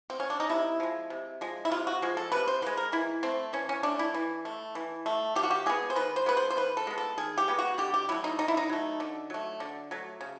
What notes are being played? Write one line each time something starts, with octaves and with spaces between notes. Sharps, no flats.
C4
C#4
D4
D#4
C3 E4
F3 G#3
C3
F3 G#3
E4
C3 F4
F#4
F3 G#3
A4
C3 B4
C5
F3 G#3 B4
A#4
E3 E4
A3 C4
E3 C#4
C#4
A3 D4
E4
E3
A3
E3
A3
D#3 G4
F#4
G4
G#3 B3 G#4
C5
D#3 B4
C5
G#3 B3 B4
C5
C5
D#3 B4
A4
G#3 B3
A4
D#3 G#4
G4
G#3 B3
F#4
D3 G4
G4
F#3 A3 E4
D#4
D3 D#4
E4
D#4
F#3 A3
D3
F#3 A3
D3
F#3 A3
C#3